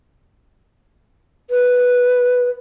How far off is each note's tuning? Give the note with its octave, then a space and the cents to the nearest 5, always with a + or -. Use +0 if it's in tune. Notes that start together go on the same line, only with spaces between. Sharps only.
B4 -5